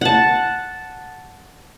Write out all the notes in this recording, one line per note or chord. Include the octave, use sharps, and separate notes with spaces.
F#5 A5